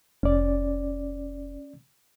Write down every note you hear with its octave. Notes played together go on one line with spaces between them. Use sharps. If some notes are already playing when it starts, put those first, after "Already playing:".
F1 C#4 D5